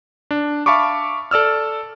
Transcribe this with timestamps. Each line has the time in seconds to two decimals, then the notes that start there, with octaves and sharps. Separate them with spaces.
0.31 D4
0.66 E5 F5 A5 B5 C#6 D6
1.31 A4 D5 E6 F6